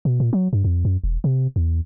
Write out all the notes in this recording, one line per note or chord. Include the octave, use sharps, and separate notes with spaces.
B2
A#2
F#3
G2
F2
F#2
E1
C3
E2